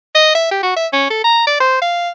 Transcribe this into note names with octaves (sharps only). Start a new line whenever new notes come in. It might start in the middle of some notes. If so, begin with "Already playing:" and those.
D#5
E5
G4
F#4
E5
C#4
A4
A#5
D5
C5
F5